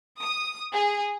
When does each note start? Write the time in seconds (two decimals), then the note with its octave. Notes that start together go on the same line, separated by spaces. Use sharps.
0.20 D#6
0.72 G#4